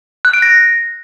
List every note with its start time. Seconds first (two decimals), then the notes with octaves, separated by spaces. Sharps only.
0.25 F#6
0.34 D7
0.42 A#6